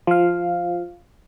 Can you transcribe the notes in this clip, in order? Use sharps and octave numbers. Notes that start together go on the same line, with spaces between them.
F3 F5